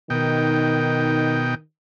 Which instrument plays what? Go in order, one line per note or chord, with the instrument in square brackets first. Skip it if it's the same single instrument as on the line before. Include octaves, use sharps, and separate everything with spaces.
[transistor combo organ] B2 D#4 G5 [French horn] D#3